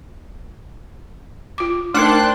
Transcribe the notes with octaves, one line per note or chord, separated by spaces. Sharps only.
F4 D6
A3 D4 D#4 A#4 C5 G5 C6 F#6